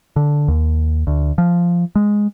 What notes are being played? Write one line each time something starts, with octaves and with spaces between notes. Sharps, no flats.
D3
D#2
D2
F3
G#3